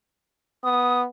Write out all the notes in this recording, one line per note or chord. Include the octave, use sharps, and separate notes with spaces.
B3 D#6